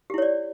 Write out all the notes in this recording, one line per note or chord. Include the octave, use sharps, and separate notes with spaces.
E4 G4 C#5 D5